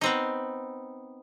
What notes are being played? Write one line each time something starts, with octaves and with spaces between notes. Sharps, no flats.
B3 C4 D#4